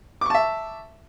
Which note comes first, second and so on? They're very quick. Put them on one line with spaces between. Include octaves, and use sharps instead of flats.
D6 C#6 A5 E5